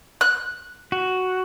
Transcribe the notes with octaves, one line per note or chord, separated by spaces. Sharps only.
F#6
F#4